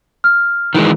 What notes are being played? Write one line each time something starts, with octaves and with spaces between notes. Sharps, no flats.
F6
D#3 E3 G#3